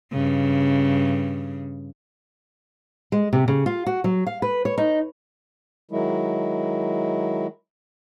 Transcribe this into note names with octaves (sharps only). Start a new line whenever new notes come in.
G2 C#3
G#3
C3
C#3
F4
F#4
F#3
F5
B4
C#5
D#4
D#3 F#3 G#3 E4